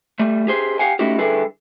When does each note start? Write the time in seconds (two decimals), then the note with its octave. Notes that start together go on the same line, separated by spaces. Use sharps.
0.19 G3 A3
0.47 G4 G#4 C5
0.79 G4 F5 F#5 G#5
0.99 A3 C#4 D#4 E4 F#4 G4
1.18 D3 G3 E4 G#4 A4 B4